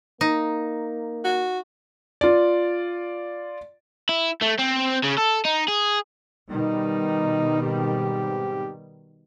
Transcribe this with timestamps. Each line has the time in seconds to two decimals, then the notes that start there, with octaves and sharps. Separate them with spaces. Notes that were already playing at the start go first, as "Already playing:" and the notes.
0.21 A#3 D#4
1.24 F#4
2.21 F4 D5
4.09 E4
4.41 A3
4.59 C4
5.04 C#3
5.18 A4
5.45 D#4
5.68 G#4
6.50 B2 D#3 G3 D#4
7.61 G#2 C4 G4